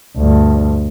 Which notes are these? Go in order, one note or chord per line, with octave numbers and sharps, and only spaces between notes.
D2 G2